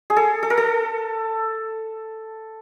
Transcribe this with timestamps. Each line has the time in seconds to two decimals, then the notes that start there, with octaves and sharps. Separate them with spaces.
0.10 G#4
0.17 A4
0.43 A4
0.50 A#4
0.57 A4